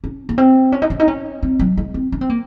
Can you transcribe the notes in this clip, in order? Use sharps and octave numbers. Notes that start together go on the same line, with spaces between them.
C#4
A#3
C4
C#4
D#4
C#4
D#4
C#4
C4
F#3
G#3
C4
C#4
C4
A#3